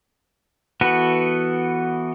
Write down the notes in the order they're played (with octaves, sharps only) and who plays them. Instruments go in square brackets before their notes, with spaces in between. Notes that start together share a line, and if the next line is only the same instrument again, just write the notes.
[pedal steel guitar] E3 B3 F#4 A4 B4